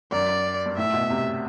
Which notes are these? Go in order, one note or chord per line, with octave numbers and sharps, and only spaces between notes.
F#2 D5
G2
A2 E5
B2
C3